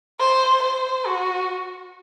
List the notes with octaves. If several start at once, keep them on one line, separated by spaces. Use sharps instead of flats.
C5
C5
F#4